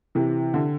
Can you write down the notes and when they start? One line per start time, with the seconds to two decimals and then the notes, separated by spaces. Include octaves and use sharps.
0.15 C3 E3
0.54 D3